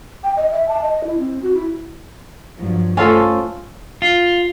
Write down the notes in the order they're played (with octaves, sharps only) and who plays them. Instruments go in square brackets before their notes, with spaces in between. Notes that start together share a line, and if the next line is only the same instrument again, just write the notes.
[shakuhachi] G5
D#5
E5
A5
D#5
E4
C4
F#4
E4
[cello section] G2 F3 F#3
[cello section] A3 C5 [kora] C#4 F4 A4
[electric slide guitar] F4